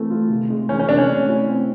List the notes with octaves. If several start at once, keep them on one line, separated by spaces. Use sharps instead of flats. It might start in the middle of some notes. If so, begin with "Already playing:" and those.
Already playing: E3 A3 C4
F4
C3
G#3
E3 C#4
C#4
C3 D4
C#4
A3
E4
C4